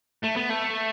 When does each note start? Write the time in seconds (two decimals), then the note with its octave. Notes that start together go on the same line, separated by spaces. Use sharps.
0.24 A3
0.37 B3
0.50 A3